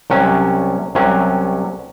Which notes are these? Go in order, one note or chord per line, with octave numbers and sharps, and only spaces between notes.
C2 C3 F#3 C#4
C2 C3 F#3 C#4